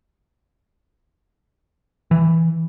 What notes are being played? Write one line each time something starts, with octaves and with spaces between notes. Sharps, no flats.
E3